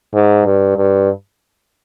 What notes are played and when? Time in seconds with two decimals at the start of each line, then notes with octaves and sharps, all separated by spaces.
0.14 G#2
0.45 G2
0.77 G2